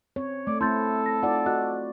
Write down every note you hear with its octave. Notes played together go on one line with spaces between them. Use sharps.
C4 C#5
A3 D5
A3 C4 E4 A4 C6 G6 A6
A#6
D#4 F4 D5 F#5
F#4 D#5 F#5 F#6